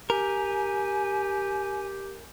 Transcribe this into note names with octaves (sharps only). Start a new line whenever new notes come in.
G4 A#4 G#5